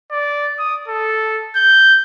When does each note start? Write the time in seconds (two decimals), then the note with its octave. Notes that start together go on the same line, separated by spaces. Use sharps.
0.12 D5
0.59 D#6
0.88 A4
1.56 G6